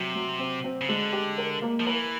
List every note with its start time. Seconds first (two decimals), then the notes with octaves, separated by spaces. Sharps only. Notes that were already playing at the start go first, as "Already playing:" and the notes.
Already playing: C3 F#3
0.15 F#3
0.39 C4
0.64 C4
0.81 C#3
0.89 D3 G#3
1.13 G4
1.38 A#4
1.62 A#3
1.80 F3
1.86 E3 A#4